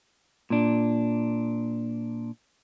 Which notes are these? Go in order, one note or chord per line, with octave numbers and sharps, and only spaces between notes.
A#2 D4